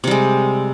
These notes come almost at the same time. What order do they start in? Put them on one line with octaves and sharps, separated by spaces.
C3 G3 G#3